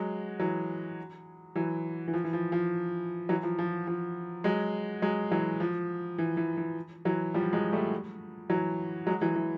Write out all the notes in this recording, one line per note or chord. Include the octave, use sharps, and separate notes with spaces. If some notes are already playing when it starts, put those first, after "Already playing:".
Already playing: F#3 G#3
E3 F#3
E3 F#3
E3
F3
E3
F3
F3
E3 F#3
F3
F3
F3
F#3 G#3
F#3 G#3
E3 F#3
F3
E3
E3
E3
E3 F#3
F3 G3
F#3 G#3
G3 A3
E3 F#3
F#3 G#3
E3 F#3
E3